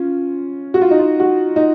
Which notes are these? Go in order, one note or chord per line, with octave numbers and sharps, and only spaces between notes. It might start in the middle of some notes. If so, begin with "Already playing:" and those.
Already playing: C#4 F4
F#4
F4
D#4
F4
F#4
D#4